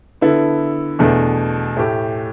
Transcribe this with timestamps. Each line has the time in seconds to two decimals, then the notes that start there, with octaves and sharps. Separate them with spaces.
0.21 D3 B3 E4 A4
0.99 E2 B2 A3 D4
1.77 A2 A3 G4